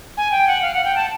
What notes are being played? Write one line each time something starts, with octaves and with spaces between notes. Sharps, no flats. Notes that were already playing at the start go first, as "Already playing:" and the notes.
G#5
G5
F#5
F5
F#5
G5
A5